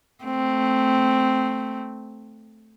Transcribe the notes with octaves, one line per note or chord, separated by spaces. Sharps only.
A3 C4